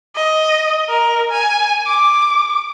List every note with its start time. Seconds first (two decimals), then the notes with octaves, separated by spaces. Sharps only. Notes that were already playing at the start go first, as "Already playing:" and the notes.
0.16 D#5
0.89 A#4
1.31 G#5
1.87 D6